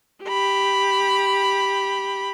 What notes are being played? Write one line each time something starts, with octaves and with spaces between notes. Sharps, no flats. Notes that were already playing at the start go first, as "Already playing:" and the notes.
G4 B5